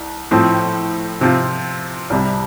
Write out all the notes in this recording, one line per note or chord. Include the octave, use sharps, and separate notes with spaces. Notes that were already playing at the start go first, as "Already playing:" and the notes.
Already playing: C2
A2 F3 C4
C3 F3 C4 F4
C2 C3 G3